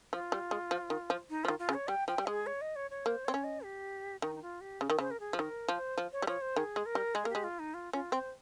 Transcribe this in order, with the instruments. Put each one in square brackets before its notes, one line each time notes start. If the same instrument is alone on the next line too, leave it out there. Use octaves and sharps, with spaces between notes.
[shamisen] F3 [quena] F4
[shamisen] G3
G#3
F3
D#3
F3
[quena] D#4
[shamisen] F3 [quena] F4
[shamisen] D#3
[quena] F4
[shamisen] C#3
[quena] C#5
[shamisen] G3 [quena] G5
[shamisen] F3 [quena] G5
[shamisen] G3
[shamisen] G#3 [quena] G#4
[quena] C#5
D#5
C#5
C#5
[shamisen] A#3 [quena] C5
[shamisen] C4 [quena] C#5
[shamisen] C#4
[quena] D#5
G4
[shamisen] D#3 [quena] D#4
[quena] D#4
F4
G4
[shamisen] C#3
D#3
[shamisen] C#3 [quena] C5
[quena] A#4
G#4
[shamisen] F3
[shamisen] D#3 [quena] A#4
[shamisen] F3 [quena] C5
[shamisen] F3
[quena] C#5
[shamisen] G3
[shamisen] F3 [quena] C#5
[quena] C5
[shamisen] D#3 [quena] G#4
[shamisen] G#3
[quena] A#4
[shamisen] G3
[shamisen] G#3 [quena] G#4
[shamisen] A#3
[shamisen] G#3 [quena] G4
[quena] F4
D#4
F4
[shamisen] C#4 [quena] F4
[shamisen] C4 [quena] C5